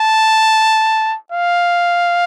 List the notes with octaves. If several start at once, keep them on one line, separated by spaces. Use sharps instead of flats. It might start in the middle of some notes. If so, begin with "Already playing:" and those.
Already playing: A5
F5